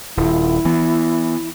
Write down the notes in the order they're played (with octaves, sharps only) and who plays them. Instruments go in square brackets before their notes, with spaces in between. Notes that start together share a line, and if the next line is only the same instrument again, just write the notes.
[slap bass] D#1 [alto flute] E4
[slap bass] E3 B3